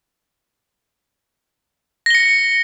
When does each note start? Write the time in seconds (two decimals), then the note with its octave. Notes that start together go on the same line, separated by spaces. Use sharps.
2.06 A#6
2.10 G7
2.15 C#7